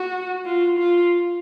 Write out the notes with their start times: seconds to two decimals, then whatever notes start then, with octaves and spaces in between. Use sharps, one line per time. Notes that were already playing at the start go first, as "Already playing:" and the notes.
Already playing: F#4
0.45 F4
0.78 F4